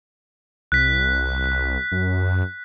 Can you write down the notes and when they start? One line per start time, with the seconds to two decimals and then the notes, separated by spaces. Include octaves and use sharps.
0.72 C2 F#6 B6
1.92 F#2